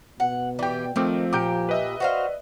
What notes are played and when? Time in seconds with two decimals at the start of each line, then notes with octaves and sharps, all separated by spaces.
0.20 B2 F#5
0.59 E3 G4 D5 G5
0.96 D#3 F3 A3 C4 D6
1.33 A#2 G4 D6 G6 D7
1.69 B4 D#5 E5
2.00 F#4 C5 D5 F5